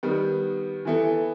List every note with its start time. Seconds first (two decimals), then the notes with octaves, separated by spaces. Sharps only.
0.03 D#3 G3 B3
0.85 E3 B3 E4 A4